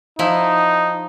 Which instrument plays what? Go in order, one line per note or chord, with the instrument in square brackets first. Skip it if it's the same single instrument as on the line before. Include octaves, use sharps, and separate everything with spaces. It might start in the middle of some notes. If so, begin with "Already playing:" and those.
[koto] F3 E4 [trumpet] D#4